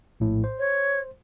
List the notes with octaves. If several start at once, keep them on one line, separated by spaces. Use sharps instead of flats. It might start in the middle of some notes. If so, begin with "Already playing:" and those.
A#1 A2
C5
C#5